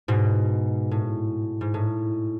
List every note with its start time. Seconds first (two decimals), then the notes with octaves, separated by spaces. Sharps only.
0.08 G#2 B2
0.91 A2
1.61 G#2
1.74 A2